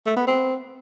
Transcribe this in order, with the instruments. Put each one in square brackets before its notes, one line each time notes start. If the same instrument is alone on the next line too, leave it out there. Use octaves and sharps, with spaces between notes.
[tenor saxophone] A3
B3
C4